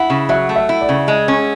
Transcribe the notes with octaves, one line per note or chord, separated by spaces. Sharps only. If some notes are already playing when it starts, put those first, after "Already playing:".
Already playing: E4 F#5
C#3
F#3 E5
A3
E5
E4
D5
C#3
G#3
C#4